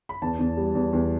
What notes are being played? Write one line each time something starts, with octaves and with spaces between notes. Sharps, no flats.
B5
E2 A5
E2
G3
E2
E2